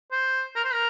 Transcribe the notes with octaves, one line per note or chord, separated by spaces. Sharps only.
C5
A#4
C5
A#4